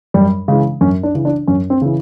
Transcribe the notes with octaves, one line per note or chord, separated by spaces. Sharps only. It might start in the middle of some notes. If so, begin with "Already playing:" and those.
F#2 G3
C#3 E3 G#3
F#2 C#4
D4
C#3 E3
D4
F#2 C#4
C4
C#3 E3